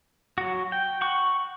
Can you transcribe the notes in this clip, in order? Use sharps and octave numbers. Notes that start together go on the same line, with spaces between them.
F#3 F#4
G5
F#5 C#6